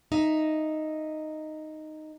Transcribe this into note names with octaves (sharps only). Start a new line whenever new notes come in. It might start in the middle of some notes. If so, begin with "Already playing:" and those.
D#4 E5